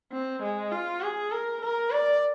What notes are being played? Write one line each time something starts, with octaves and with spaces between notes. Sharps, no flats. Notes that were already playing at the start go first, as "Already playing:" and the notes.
C4
G#3
F4
G#4
A#4
A#4
D5